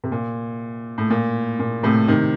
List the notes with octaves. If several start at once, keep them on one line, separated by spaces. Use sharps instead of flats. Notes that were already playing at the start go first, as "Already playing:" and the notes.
C3
A#2
A2
A#2
A#2
A2 C3
C3 D#3